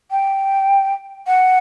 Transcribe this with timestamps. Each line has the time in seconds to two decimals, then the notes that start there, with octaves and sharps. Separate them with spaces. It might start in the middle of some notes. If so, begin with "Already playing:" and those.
0.11 G5
1.27 F#5